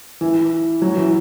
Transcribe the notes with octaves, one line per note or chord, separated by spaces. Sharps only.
E3
F#3
E3